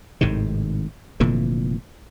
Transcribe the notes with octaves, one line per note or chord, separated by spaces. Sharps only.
G#1 A2 C3 D#3
F1 A#2 D3 E3